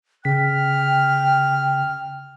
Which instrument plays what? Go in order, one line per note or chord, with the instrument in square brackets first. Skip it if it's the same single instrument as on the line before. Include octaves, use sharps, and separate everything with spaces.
[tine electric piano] C#3 B6 [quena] G5 [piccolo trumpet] F6